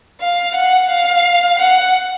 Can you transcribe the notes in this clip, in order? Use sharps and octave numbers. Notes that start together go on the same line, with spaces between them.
F5
F#5
F5
F#5